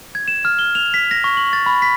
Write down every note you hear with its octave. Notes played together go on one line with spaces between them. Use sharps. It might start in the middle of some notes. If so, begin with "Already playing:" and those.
G#6
E7
F6
G7
F7
B6
A#6
C#6
F#7
A6
B5
B6